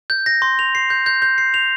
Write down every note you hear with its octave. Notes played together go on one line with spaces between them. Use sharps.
G6
A#6
C6
F7
C7
G6
G6
G6
C7
F7